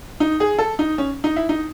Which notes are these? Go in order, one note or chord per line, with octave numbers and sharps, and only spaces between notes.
D#4
G#4
A4
D#4
C#4
D#4
E4
D#4